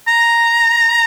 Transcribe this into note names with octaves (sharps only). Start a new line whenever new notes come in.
A#5